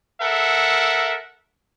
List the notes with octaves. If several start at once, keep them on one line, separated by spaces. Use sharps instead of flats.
A4 A#4 E5 F#5